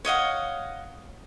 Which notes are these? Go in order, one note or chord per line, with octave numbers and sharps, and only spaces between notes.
C#5 D#5 F5 F#5